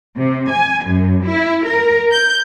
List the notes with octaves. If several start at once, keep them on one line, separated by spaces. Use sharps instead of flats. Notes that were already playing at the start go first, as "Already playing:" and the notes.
C3
G#5
F#2
E4
A#4
G6